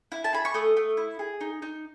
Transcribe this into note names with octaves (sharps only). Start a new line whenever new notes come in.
E4
A5
G#4 B5
C#6
A3 D#6
A3
E4
G#4
D#4
D#4